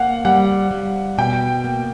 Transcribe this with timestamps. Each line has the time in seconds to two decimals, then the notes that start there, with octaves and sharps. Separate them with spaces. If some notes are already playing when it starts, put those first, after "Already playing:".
Already playing: A#3 F5 F#5
0.25 G3 F#5
0.71 G3
1.18 B2 G5
1.64 A#3